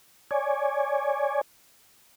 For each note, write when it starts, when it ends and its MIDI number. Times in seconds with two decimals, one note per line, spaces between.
0.31 1.41 73
0.31 1.41 74
0.31 1.41 80